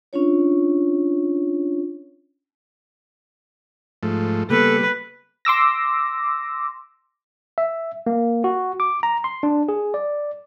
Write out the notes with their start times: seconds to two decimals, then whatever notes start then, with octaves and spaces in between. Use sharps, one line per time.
0.13 C#4 D4 F4 C#5
4.03 G#2 F3 A3
4.50 C#3 G3 A#3 B3 A4 B4
5.45 C6 D6 E6 A#6
7.58 E5
8.07 A#3
8.44 F#4
8.80 D6
9.03 A#5
9.24 C6
9.43 D4
9.69 G#4
9.94 D5